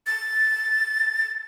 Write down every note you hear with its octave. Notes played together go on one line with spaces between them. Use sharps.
A6